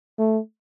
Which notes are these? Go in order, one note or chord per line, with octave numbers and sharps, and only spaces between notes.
A3